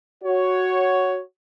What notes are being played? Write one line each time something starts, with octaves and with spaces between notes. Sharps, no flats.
F#4 C#5